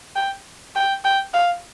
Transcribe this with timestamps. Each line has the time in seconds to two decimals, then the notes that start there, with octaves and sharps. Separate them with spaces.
0.16 G5
0.76 G5
1.04 G5
1.34 F5